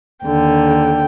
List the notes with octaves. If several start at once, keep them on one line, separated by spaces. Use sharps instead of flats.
D#2 D3 G5